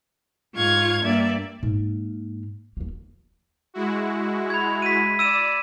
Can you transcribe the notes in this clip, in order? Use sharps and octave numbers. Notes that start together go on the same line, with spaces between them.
G#2 F4 F5 C#6 G#6
G2 A#3 D5 E5
G#2 A#3
D#2 A#3
G#3 E4 F#4
B5 G#6
B6 D#7
D5 E6 D#7 E7